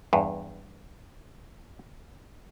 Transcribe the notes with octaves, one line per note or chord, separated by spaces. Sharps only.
E2 G2